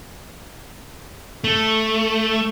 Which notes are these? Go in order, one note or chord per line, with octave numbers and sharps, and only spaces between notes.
A3